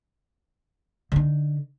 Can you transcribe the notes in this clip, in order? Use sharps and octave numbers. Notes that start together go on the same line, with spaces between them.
D3 D#4